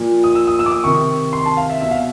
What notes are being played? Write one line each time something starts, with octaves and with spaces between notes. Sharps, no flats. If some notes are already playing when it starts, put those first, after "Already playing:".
Already playing: A#2 F3
D#6
E6
D#6
E6
D6
D#6
C3 D#3 C#6
C6
A5
F5
E5
B2 E5
F5